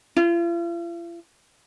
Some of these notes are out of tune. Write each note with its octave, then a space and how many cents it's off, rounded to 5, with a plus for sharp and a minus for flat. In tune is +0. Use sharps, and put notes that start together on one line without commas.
F4 -45